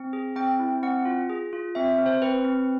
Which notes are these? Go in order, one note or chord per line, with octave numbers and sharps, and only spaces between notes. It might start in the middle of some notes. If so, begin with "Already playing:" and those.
Already playing: C4
G#4
C4 G5
E4
C4 F#5
F4
G#4
F4
C4 E5
C4
C5
C4 B4
C4